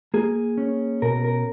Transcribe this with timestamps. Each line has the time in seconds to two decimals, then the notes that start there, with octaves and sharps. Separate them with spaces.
0.14 A#3 G#4
0.58 C#4
1.02 B2 A#4
1.24 A#4